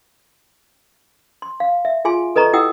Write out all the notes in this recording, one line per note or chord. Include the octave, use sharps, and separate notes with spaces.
C6
F5
E5
F4 G#4 G#5 C6
A4 B4 D#5 A#5 C#6
E4 G4 F#5 G5 D#6 E6